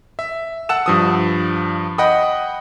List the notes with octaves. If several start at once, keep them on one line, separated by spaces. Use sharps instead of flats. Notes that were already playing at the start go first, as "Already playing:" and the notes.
E5
F#5 A5 E6 E7
G2 F3 D#6
D#5 F#5 G5 B5 D#6